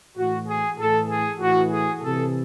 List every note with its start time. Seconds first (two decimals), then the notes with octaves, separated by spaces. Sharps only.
0.17 A2 E3 F#4
0.48 G#4
0.79 A2 E3 A4
1.09 G#4
1.41 A2 E3 F#4
1.71 G#4
2.02 C3 E3 A4